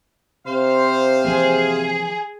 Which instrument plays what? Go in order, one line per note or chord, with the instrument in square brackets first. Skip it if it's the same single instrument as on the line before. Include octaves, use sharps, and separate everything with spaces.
[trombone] C3 [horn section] C5 F5
[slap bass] E3 F3 A#3 [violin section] G#4